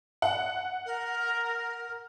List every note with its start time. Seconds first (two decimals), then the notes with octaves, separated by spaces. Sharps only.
0.22 F#5
0.86 A#4